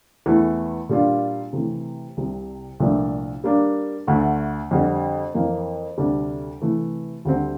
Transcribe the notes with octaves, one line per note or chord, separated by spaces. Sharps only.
E2 E3 A3
A#2 G3 D4 F4
C3 E3 A3
C2 C3 G3
C2 A#2 F3 A3 D4
G3 A#3 D4
D2 D3 A3
F2 D3 G3
F2 E3 A#3
D2 C3 G3 D4 A4
C3 E3 A3
D2 D3 G3 C4